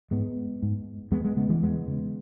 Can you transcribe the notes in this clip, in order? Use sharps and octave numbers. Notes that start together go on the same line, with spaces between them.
G#2 G#3 B3
G#2
E2 G#3 B3
G#3 B3
C#3 G#3 B3
E3 G#3
E2 G#3 B3
C#3